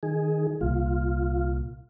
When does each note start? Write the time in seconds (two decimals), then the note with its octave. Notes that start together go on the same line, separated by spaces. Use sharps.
0.03 D#3 G#4
0.61 C2 A#2 F4